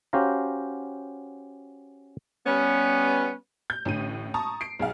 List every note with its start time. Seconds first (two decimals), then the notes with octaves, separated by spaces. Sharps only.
0.13 C#4 F#4 G4 C5 F5 A#5
2.46 G3 B3 C#4
3.70 G6
3.85 A1 A2 D3 D#7
4.34 A5 A#5 C#6 D#6
4.61 C7 D7
4.79 B1 G#4 F5 F#5